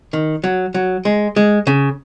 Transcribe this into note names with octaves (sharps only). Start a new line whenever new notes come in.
D#3
F#3
F#3
G#3
G#3
C#3